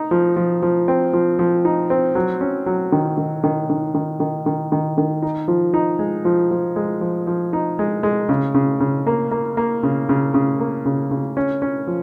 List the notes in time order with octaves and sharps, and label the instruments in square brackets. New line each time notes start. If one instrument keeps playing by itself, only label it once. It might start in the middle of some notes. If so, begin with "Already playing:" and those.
Already playing: [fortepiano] D#4
F3
F3
F3
C4
F3
F3
D#4
C4
F#3
C#4
F#3
D#3
D#3
D#3
D#3
D#3
D#3
D#3
D#3
D#3
D#4
F3
D#4
G#3
F3
F3
G#3
F3
F3
D#4
G#3
G#3
C#3
C#3
C#3
A#3
A#3
A#3
C#3
C#3
C#3
A#3
C#3
C#3
C#4
C#4
F3